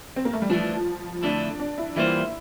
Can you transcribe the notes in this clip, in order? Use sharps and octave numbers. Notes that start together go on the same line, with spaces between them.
C4
A#3
A3
G3
E3 F3 A3 D4
F2 D3 A3 D4 E4
D4
E4
E3 G3 A#3 E4 F4 C5